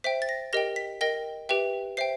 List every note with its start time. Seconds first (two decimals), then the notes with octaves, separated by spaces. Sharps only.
0.04 C5 E5 G5 B6
0.22 A6
0.29 A#6
0.53 G4 A#4 D#5 G5 A#6
0.76 B6
1.01 A#4 D#5 G5 A#6
1.49 G4 B4 E5 G5
1.97 C5 E5 G5 C7